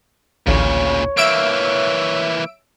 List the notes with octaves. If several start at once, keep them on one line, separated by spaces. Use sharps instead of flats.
A1 D2 A#2 C#3 C#5
E3 A#3 E5 E6 D7